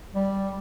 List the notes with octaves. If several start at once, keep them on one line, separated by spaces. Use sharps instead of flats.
G3